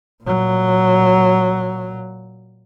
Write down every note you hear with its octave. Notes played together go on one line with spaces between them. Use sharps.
A#2 F#3